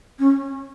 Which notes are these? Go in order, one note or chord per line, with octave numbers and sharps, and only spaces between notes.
C#4